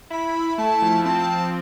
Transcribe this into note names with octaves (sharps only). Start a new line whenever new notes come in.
E4 B5
E4
A3 A5
F3
C4 A5
C4